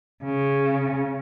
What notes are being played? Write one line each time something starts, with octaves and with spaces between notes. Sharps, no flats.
C#3